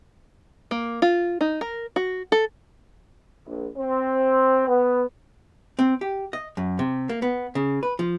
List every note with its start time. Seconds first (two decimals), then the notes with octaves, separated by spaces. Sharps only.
0.71 A#3
1.02 F4
1.41 D#4
1.61 A#4
1.96 F#4
2.32 A4
3.47 A#1
3.77 C4
4.68 B3
5.79 C4
6.01 G4
6.33 D#5
6.57 F#2
6.79 C3
7.09 A#3
7.22 B3
7.55 C#3
7.83 B4
7.99 F3